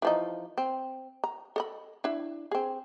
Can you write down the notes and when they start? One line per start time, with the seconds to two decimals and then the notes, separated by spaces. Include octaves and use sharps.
0.02 E3 F3 D#4
0.58 C4
1.24 A#5
1.56 A4 D#5 B5
2.04 D4 E4
2.51 C4 G#4